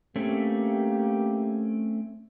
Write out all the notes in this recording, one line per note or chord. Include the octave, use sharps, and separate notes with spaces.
A3 A#3 C4 C#4 G4